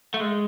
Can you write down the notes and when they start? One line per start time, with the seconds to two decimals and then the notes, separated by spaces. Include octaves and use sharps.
0.14 A3
0.20 G#3